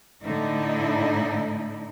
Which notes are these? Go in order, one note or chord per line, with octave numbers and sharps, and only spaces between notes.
A2 D3 D#4 E4